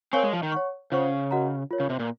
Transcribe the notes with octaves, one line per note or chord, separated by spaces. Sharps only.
C4 A#4 C#5 F5 G#5 C#6
G#3
F3
D#3
C#5 F#5 C#6
C#3 F4 C5 F#5 C#6
F#4 A#4 D#5 F#5 A#5
F4 A#4 C#5
C#3
C3
A#2